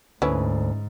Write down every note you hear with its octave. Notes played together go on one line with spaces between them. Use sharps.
D2 G#2 C#4 E4 B4